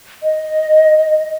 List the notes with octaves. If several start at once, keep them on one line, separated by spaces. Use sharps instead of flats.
D#5